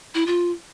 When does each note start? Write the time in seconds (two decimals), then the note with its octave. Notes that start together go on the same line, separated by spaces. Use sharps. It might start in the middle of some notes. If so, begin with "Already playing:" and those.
0.14 E4
0.27 F4